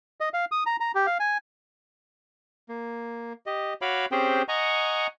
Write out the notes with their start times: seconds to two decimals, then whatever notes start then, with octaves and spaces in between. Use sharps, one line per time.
0.20 D#5
0.34 F5
0.52 D#6
0.66 A#5
0.80 A#5
0.95 G4
1.07 F5
1.20 G#5
2.69 A#3
3.46 G4 D#5
3.82 F#4 C#5 F5 B5 D6
4.12 C4 C#4 G4 G#4 C5 G5
4.48 D#5 F#5 G#5 A#5 C#6